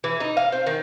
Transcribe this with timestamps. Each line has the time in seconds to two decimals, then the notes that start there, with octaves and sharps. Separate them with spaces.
0.04 E3
0.20 D#4
0.37 F5
0.52 C4
0.67 D#3